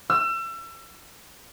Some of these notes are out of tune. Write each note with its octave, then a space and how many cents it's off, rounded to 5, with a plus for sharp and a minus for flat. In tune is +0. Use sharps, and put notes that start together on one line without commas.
E6 +35